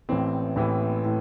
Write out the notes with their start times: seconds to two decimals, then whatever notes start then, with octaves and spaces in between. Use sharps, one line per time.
0.09 A1 A2 E3 C4
0.56 A1 A2 E3
1.04 A2